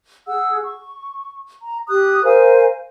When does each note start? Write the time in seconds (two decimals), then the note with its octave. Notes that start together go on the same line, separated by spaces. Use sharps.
0.27 G#4 F#5 E6
0.64 C#6
1.61 A#5
1.88 G4 D#6 F#6
2.24 A#4 C5 F5 G#5